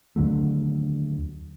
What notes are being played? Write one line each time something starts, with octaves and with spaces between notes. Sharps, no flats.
D#2 D3 F#3 A3